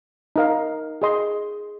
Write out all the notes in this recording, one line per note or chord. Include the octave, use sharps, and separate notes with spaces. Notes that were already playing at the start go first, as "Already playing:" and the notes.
D#4 A#4 F5
G#4 D#5 C6